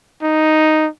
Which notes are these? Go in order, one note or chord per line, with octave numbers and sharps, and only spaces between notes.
D#4